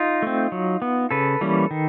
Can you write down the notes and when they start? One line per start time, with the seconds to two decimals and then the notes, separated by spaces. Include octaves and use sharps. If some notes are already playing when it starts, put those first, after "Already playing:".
Already playing: D#4 F4
0.22 A3 C4
0.52 F#3
0.82 B3
1.11 C#3 A4 B4
1.41 E3 G3 A#3 C#4
1.71 D#3